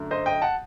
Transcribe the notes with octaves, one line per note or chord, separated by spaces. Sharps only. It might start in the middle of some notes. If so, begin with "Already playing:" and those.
Already playing: F#2 D3 A3
C5 D#5
D#5 G5
F#5 A5